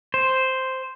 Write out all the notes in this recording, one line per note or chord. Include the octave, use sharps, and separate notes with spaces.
C5